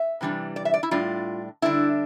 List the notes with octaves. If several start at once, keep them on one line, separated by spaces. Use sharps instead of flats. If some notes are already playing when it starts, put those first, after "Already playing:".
Already playing: E5
C3 E3 G3 D4
D5
E5
D5
E4
A2 G3 D4 F4
D3 G3 D4 E4